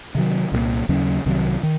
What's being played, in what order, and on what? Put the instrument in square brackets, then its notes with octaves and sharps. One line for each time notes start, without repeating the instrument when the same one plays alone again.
[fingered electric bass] C3 D#3 F#3
C2 A#2 F3 A#3
D#2 C#3 F#3 C#4
C2 C3 D#3 F#3
D#3